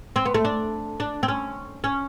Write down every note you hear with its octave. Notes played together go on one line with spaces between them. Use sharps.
C4
B3
A3
D4
D4
C4
C#4
C#4